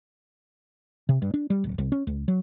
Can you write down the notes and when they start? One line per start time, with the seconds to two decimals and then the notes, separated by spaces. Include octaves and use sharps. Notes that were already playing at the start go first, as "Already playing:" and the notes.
1.09 C3
1.22 G2
1.34 D4
1.50 G3
1.64 D1
1.78 C2
1.92 C#4
2.07 C#2
2.28 F#3